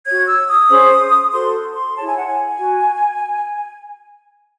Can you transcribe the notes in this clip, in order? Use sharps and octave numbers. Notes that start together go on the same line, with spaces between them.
F#4 C#5 G#6
E6
D#6
C#4 G#4 C5
F#4 A4 C5 C6
C6
E4 G#4 C#5 A5
G#5
F#5
G#5
F#4